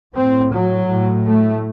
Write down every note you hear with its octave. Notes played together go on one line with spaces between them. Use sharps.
A2 C4
F#3
A2
A3